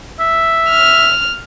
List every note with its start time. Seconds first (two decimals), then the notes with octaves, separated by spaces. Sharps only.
0.20 E5
0.70 F6